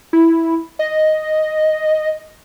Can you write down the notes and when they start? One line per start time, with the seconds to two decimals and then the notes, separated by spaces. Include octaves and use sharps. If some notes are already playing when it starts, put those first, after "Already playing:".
0.13 E4
0.79 D#5